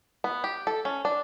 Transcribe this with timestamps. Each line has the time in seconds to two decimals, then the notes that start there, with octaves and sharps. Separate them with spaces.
0.24 B3
0.44 G4
0.67 A4
0.85 C#4
1.05 D4